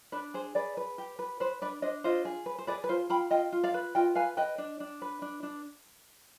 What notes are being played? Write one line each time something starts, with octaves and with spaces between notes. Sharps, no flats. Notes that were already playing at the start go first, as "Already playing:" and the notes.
D4 B4
G#4 C5
G#4 B4 D5
B4
G4
B4
B4 C5
D4 B4 D5
D4 C5 D#5
F4 C5 D#5
G#4
B4
C5
G#4 B4 D5
B4
F4 C5
F4 G5 B5
F4 D#5 G5
F4
D5 F5
B4
F4 D#5 G5
B4 F5 G#5
B4 D#5 G5
D4
D4
B4
D4
D4